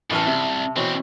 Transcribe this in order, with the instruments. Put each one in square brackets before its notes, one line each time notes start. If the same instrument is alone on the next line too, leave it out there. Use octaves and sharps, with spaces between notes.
[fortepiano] A1 E3 F6 [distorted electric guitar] A2 [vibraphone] E5 A5
[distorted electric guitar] C2 [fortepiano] C3
[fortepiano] B2 E3 C#5 [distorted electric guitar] C4 D4